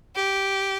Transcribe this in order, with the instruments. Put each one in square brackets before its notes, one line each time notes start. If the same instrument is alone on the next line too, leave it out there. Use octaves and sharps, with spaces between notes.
[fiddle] G4